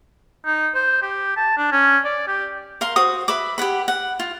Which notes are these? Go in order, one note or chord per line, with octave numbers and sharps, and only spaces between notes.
D#4
C5
G4
A5
D4
C#4
D5
G4
A#4 F5 C6
F#4 C5 D#6
B4 E5 B5 D6
G4 B4 F#5 B5
F#5
F4